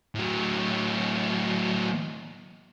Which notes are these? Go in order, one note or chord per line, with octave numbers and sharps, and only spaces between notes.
A2 F#3